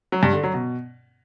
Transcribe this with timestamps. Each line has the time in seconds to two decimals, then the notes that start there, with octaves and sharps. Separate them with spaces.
0.12 F#3
0.23 G2
0.33 D3
0.44 F#3
0.54 B2